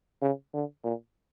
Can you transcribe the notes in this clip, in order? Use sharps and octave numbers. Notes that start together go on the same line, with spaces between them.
C#3
D3
A#2